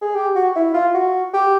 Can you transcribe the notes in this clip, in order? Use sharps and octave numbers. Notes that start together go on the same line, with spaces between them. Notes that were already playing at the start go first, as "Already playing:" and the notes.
G#4
G4
F#4
E4
F4
F#4
G4